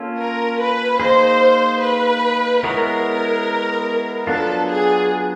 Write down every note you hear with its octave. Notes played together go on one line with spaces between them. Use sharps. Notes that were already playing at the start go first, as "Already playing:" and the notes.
Already playing: A#3 C#4 F4 A4 C#5
A#4
B4
A#3 D#4 G#4 C5
B4
G#3 B3 E4 G#4 A#4 C#5
F#3 B3 D4 F4 A4
G#4